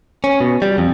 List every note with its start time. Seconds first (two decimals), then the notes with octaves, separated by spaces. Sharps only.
0.24 C#4
0.41 B2
0.62 G3
0.78 F2